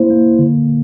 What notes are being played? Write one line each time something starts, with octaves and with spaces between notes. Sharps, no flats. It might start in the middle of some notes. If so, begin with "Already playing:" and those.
Already playing: A#3 E4 C5
A#3
D3